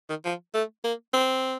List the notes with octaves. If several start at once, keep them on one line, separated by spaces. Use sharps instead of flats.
D#3
F3
A3
A#3
C4